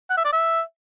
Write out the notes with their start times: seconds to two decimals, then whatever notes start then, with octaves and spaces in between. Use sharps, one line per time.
0.10 F#5
0.17 E5
0.25 D5
0.33 E5